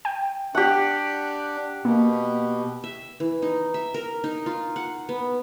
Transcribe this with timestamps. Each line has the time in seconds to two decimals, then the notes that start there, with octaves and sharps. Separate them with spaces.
0.05 G5
0.55 D4 G4 F#5
1.85 B2 A#3
2.84 E5
3.20 E3
3.42 D#4
3.74 E5
3.94 A#4
4.24 D#4
4.46 F4
4.76 F#5
5.09 B3